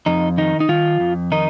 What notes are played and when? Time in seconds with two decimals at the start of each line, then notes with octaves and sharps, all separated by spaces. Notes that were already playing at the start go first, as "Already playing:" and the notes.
0.06 F2 D#4
0.38 D#3 D#4
0.60 D#4
0.69 D#3 F4
1.00 F2
1.32 D#3 D#4